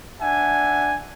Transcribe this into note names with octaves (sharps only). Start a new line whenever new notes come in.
D4 E5 F#5 G#5